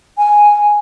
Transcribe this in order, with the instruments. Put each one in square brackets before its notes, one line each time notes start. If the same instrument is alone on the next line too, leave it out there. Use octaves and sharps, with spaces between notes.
[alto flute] G#5